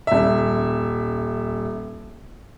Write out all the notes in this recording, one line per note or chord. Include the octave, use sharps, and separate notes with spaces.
D#1 E5